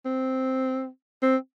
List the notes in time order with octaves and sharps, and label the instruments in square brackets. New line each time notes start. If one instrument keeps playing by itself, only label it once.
[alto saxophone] C4
C4